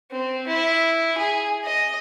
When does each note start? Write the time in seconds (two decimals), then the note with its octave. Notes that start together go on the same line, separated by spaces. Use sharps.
0.12 C4
0.47 E4
1.18 G#4
1.65 D#5